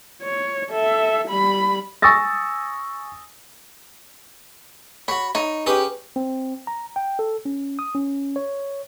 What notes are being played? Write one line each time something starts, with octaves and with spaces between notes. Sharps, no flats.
C#5
A4 E5
G3 B5
G#5 C#6 D#6 E6 A6 A#6
F#4 C#5 B5
D#4 C#5
C#4 G4 G#4 B4
C4
A#5
G5
A4
C#4
D#6
C#4
C#5